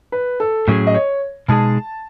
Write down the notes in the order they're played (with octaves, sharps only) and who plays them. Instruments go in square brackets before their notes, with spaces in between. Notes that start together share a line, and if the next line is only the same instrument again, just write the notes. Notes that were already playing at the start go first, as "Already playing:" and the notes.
[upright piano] B4
A4
[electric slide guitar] A2 F#3 C#4 G#4
[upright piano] D#5
C#5
[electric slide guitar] B2 G#3 D#4 G#4 [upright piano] A5